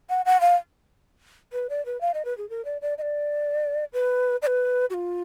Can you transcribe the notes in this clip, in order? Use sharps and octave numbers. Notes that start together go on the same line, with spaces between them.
F#5
F#5
F5
B4
D5
B4
F5
D#5
B4
G#4
A#4
D5
D5
D#5
D5
B4
D5
B4
F#4
F4